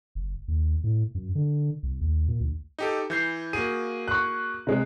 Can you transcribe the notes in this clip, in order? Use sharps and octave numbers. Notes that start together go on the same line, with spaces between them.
F#1
D#2
A2
F#2
D3
C2
D#2
A#2
D2
D#4 G4 A4
E3 G6 C7
A#3 F#4 G#4 D#7
C#6 F#6
C3 G#3